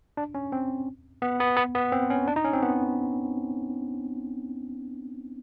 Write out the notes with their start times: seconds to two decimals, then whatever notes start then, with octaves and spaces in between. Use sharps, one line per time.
0.17 D4
0.35 C#4
0.52 C4
1.22 B3
1.40 B3
1.57 B3
1.75 B3
1.92 C4
2.10 C#4
2.27 D4
2.36 D#4
2.45 C#4
2.53 C4
2.62 B3